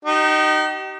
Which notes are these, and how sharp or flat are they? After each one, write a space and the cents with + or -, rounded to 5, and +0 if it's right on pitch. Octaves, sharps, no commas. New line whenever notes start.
D#4 -15 G4 -40